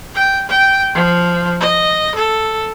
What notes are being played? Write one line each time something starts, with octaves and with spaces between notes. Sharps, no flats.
G5
G5
F3
D#5
A4